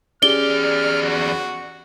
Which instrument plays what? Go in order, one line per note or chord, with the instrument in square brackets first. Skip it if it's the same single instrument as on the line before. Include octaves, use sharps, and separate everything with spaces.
[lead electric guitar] E2 D5 [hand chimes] C#4 G4 G#4 [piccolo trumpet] F6 [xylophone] G7
[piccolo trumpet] F#4